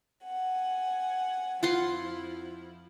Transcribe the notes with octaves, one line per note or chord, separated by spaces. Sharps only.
F#5 G#5
F2 F3 E4 F4 F#5 C6